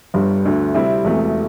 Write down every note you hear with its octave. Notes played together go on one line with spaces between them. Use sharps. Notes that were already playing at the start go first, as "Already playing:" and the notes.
G1 G2 G3
D2 D3 A3
C3 G3 C4 E4
E1 E2 C3 A3